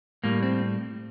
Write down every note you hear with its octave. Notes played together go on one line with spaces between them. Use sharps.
A2 G3 A#3
C4